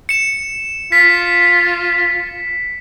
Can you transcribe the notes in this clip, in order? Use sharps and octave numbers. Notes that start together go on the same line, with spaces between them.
C#7 E7
F4 B6